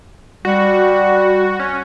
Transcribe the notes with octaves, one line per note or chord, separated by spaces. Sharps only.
G3 F#4
C#4